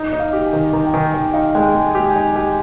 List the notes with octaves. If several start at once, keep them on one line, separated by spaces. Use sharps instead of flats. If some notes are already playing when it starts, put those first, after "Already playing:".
Already playing: D#4
D#4
F5
G4
G#5
D#3
D#3 A#5
G5
D#3 G#5
D#3 G5
D#4 F5
G#3 G5
G#5
G5
G#3
G#5
G4
G#5
D#4
G4 G#5